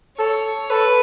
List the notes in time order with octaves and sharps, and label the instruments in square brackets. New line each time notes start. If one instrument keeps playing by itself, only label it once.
[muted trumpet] A4 [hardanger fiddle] C#5
[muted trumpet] A4 [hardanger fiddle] B4